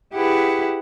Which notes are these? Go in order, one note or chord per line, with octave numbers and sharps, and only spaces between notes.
E4 G4 G#4 B4 F#5